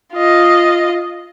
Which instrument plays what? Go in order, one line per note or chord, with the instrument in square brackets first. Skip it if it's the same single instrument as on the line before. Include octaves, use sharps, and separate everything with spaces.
[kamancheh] F4 D#5